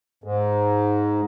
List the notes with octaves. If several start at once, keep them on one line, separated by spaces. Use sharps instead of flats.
G#2